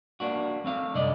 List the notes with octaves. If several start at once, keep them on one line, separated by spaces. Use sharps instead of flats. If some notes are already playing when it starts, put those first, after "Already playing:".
A#3 D4 F#4
A3 C4 F5
C2 F#2 D3 D5 D#5